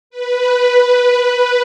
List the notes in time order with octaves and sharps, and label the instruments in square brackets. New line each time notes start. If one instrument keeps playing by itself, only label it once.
[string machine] B4